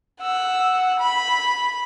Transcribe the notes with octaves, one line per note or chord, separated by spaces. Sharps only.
F#5 E6
B5